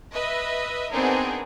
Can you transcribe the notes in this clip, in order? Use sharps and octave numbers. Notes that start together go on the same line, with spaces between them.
B4 D#5 E5
B3 C4 D4 D#4 G#4 A#4